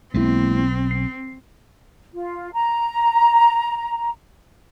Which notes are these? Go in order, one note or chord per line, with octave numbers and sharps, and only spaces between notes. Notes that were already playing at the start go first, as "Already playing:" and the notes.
B1 B2 G#3 A#3 C4 E4
C7
F4
A#5